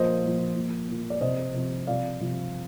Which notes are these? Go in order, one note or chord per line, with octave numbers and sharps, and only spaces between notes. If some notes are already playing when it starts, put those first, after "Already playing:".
Already playing: A#2 F3 C5 D#5
A#2 F3
A#2 F3
A#2 F3
D5
C3 F3 C5 D#5
C3 F3
C3 F3 D5 F5
C3 F3